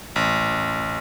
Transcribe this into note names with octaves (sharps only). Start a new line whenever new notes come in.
A1